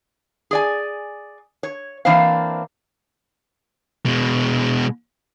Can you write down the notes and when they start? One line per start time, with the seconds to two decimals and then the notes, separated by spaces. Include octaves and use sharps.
0.51 G#4 D5 G#5
1.63 C#5
2.05 E3 A#3 C4 D4 C5 F5
4.06 B2 G#3